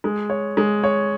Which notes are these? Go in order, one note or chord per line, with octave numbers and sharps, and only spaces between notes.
G#3
C#5
G#3
C#5